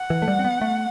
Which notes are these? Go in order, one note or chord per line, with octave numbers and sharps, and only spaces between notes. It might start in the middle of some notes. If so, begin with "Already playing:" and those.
Already playing: F#5
E3
A3
G3
C4
B3
A3